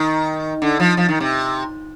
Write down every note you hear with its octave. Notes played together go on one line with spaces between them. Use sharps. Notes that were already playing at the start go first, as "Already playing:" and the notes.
Already playing: D#3
D3
F3
F3
D#3
C3